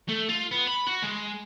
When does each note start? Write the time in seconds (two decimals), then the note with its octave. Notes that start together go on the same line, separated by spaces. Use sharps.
0.08 A3
0.29 F4
0.51 B3
0.67 B5
0.87 F#4
1.03 G#3